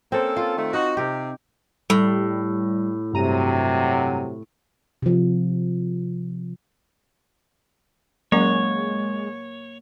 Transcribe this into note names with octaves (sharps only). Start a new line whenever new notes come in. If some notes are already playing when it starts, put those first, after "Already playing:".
A#3 C4 C#4 A4
F4
D#3 A3
D#4 F#4
C3 G4 A#4
A2 G3
G2 C3 F#3 A#5 D#7
C3 F3
F#3 G#3 A#3 C#4 C#5 F#5